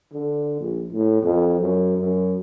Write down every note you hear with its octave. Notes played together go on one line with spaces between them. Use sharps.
D3
A#1
A2
F2
F#2
F#2